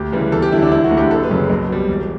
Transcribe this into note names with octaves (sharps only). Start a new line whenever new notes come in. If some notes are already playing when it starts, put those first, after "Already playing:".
Already playing: D2 G4
C#3 E3 G3
E2 A4
G4
D3 F#3 E4
D4
E1 E4
F#4
D2 D3
G4
F#1 A4
B4
F#2 C#3 F#3
B1
B2 G3
E1